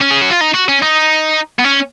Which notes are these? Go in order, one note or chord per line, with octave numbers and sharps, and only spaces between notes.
C#4
G#4
F#4
F4
D#4
F#4
C#4
D#4
B3
C#4